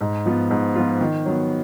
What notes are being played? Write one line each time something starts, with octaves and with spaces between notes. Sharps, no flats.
G#2
F3 B3 F4
G#2
F3 B3 F4
D#3
F#3 B3